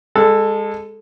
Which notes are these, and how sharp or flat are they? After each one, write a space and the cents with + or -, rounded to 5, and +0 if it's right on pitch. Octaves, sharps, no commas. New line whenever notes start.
G#3 -25 A4 +0